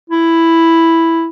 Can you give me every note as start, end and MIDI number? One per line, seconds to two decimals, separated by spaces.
0.10 1.29 64